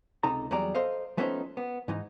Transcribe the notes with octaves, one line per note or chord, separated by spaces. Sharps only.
C#2 C3 D#4 A4 A#5
E2 F#3 G3 G#4 D5 A#5
A4 C5 D#5 F5
F3 A3 B3 C#4 D#4 C5
B3
G#2 E3 D#4